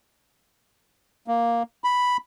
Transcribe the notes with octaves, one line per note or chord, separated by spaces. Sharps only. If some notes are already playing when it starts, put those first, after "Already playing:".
A#3
B5